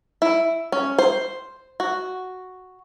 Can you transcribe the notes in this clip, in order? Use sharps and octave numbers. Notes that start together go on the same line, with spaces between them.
E4
C#4
C5
F#4